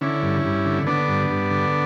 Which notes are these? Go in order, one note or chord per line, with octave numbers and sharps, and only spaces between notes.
D3 C#4 E4
G2
G2
D3
D3 B3 D4
G2
G2
D3